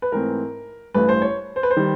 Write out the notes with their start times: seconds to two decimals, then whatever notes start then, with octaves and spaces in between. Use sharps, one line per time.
0.02 B4
0.12 G#2 E3 A3 C4 A#4
0.94 A1 G2 E3 A3 B4
1.09 C5
1.22 C#5
1.56 C5
1.63 B4
1.71 C5
1.77 D#3 G3